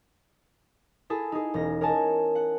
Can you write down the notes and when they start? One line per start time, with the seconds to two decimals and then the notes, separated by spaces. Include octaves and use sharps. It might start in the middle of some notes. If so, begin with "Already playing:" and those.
1.10 E4 G#4 A4
1.32 D#4 G#4
1.54 E1 C#4 A#6
1.81 A#4 C#5 D#5 G#5 A5
2.35 F#5